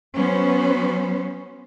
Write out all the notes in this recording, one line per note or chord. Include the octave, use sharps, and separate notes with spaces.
F#3 B3 C#4 C5